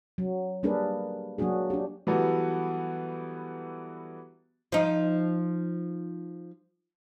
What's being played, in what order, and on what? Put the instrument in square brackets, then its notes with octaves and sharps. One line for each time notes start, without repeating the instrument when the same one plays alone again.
[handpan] F#3
G3 A#3 D4 G#4 A#4 B4
F#3 A#3 D4 F#4 G#4
D4 G4
[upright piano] E3 F#3 G3 B3 F#4 A4
[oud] F3 D#4